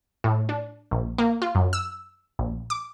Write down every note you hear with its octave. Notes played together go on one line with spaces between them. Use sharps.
A2
D4
A#1
A#3
F4
F#2
E6
A#1
D6